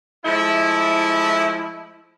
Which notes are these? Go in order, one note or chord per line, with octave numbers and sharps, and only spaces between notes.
F3 G#3 A3 E4